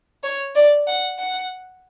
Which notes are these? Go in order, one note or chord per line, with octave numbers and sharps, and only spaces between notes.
C#5
D5
F#5
F#5